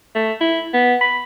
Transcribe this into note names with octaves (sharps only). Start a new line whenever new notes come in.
A3
E4
B3
B5